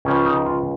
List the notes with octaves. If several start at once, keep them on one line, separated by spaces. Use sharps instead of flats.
C#2 C#3 F3 C#4
D#4
F4